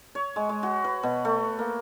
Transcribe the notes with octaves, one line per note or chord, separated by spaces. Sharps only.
C#5
G#3
G#3
F#4
B4
B2
A3
A#3